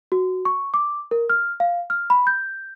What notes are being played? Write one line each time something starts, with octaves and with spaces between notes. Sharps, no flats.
F#4
C#6
D6
A#4
F6
F5
F6
B5
G6